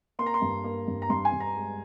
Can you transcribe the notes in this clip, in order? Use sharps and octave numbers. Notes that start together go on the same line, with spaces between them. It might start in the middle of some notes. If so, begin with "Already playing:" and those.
A#3 C6
A#5
C6
G2
A#3
G2
A#5
G2 C6
G#5
G2
A#5
G#3